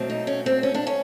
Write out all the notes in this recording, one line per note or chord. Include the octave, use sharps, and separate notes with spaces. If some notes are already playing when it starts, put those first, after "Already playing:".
Already playing: B2 F#3 A3 C4
D#4
C#4
C4
C#4
D4
C#4